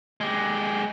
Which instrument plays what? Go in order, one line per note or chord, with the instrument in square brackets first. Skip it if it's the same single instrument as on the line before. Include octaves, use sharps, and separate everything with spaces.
[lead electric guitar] G#3 G4